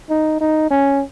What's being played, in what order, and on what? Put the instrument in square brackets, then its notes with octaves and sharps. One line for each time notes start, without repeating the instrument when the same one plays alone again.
[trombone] D#4
D#4
C#4